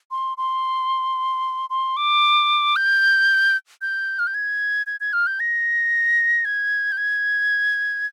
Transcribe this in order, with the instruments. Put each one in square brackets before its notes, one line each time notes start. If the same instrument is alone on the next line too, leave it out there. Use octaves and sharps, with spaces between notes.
[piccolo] C6
C6
C6
D6
G6
G6
F6
G6
G#6
G#6
G#6
F6
G6
A#6
G#6
G6
G#6